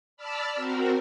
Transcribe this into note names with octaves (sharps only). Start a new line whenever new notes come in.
D5 A5 B5 E6 F6
C4 F#4 A#4